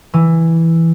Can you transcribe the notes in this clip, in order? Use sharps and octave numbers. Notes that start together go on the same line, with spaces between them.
E3